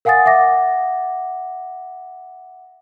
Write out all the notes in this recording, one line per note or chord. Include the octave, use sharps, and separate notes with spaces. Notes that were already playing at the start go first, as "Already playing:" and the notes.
A#4 F5 F#5 G#5 D#6 A6
E5 F#5 D6 A#6